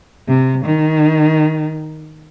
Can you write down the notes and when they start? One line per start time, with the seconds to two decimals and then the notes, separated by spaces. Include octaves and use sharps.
0.28 C3
0.64 D#3